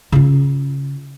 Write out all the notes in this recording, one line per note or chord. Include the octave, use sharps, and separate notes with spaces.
C#3 F4